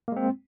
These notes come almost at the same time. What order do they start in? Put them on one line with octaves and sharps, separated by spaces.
A#3 G#3 C4